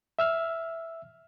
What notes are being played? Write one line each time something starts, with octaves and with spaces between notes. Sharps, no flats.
E5 E6 F6